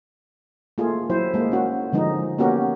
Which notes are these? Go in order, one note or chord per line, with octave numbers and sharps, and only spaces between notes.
A3 A#3 F4 G#4
F#3 E4 C5
G#3 A#3
C#4 F#4
D3 F3 G#3 D#4
A#3 B3 C#4 F#4 G4 A#4